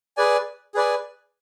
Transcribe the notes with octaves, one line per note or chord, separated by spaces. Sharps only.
G#4 B4 D5 G#5
G#4 B4 D5 G#5